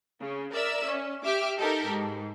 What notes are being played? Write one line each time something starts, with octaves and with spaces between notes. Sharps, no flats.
C#3
A#4 D5 E5 E6
C#4
G4 E5 D6 F6
D#4 G4 A4 A#4
G#2